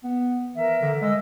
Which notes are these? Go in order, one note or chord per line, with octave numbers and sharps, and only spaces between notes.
B3
E3 A#4 E5
D3
G#3 D#5 E6